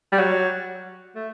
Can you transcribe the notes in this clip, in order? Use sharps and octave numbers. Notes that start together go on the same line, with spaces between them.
G3
F#3
A3